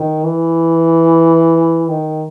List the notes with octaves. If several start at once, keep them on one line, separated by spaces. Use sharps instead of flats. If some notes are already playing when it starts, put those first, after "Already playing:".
Already playing: D#3
E3
D#3